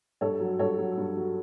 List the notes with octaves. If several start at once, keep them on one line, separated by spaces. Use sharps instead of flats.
G2 A4 C#5
F#3
G2 A4 C#5
F#3
G2
F#3